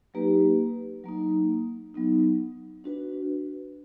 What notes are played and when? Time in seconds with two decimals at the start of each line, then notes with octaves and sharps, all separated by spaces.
0.14 F#3 A#3 D#4 G4 B4
1.04 F#3 A#3 D#4
1.94 F#3 B3 D#4
2.84 D4 F#4 B4